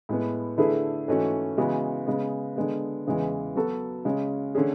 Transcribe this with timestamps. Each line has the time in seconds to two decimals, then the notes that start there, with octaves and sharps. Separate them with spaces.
0.09 A2 G#3 B3
0.58 D3 A3 E4 G#4 B4
1.08 G#2 E3 A3 C#4 F#4
1.57 C#3 E3 G#3 B3 F#4
2.06 C#3 G#3 B3
2.56 D3 G#3 B3
3.07 E2 C#3 E3 G#3
3.56 F#3 B3 F#4 A4
4.05 C#3 G#3 C#4
4.55 D3 A3 C#4 G#4